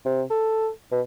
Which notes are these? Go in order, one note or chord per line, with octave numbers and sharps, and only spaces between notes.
C3
A4
B2